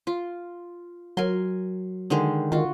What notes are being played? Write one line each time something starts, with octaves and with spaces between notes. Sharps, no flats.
F4
F#3 A#4 G#5 C6
D3 D#3 G#3
D#3 F4 F#4